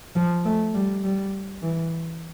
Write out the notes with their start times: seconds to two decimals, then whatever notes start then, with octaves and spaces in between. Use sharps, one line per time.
0.16 F3
0.45 A3
0.74 G3
1.04 G3
1.62 E3